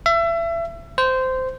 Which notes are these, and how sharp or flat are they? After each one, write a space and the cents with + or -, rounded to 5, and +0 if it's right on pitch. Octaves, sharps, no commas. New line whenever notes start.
E5 +30
C5 -15